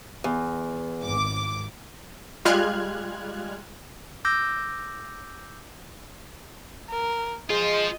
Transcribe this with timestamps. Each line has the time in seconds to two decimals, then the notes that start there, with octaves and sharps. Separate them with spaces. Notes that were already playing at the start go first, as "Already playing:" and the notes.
0.24 E2
1.02 G#1 D6
2.45 G3 G#3 F4 F6 F#6 G#6
4.25 D6 E6 G6 A#6
6.90 A#4
7.50 G#3 F4 C5 D#5